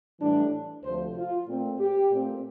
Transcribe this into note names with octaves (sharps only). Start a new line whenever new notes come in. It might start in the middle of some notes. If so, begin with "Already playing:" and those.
A2 E3 G3 D4
D2 C3 F3 A3 C5
F4
A#2 A3 C4
G4
A#2 A3 C4